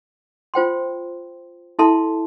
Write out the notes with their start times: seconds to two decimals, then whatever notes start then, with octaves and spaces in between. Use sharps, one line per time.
0.54 F4 C5 G5 C6
1.79 E4 A4 E5 A5 C6